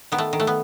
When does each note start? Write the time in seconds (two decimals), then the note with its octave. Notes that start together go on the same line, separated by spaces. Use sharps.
0.12 D#3 B3
0.18 A3
0.33 D#3
0.40 A3
0.47 B3